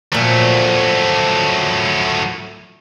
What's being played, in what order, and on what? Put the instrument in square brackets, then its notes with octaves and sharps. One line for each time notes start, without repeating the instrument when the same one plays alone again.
[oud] A#2 F3 [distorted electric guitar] F#3 A3